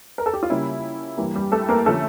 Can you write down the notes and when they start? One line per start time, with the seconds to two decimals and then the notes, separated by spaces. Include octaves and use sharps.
0.18 A#4
0.26 A4
0.33 G4
0.43 F4
0.50 C#3 G3 A#3 C#4 E4
1.18 G2 E3 G3 A#3
1.35 G3 G4
1.52 A3 A4
1.69 A#3 A#4
1.86 D3 F3 A3 C#4 A4